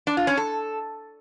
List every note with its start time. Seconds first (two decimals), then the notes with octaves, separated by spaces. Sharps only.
0.07 D4
0.17 F4
0.27 C#4
0.37 A4